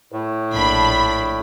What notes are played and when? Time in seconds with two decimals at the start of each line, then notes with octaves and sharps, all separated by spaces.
0.12 A2
0.52 A#1 D4 B5